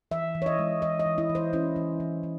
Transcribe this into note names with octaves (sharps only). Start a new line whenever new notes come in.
E3 E5
E3
C#5
D#5
G#3
E3 D#5
D#5
E3
E4
E3
C5
C#4 E4
E3
E3
E3